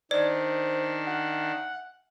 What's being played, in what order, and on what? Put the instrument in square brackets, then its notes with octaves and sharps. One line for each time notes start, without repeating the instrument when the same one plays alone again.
[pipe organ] D#3 D4 [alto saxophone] C5 [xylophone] D5
[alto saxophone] F#5